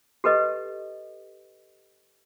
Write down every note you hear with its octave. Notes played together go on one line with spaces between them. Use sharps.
G4 A4 B4 D#5